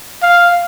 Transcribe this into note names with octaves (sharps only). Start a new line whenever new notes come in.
F5